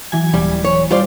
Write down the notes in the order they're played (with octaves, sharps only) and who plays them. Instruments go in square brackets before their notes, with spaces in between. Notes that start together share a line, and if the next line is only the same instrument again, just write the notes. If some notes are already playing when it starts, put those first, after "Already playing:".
[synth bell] E3 F#3 G#5
[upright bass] D#1 [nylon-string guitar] G3
[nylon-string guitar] C#5
[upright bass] D#3 [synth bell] G3 [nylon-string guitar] F4 C5 D5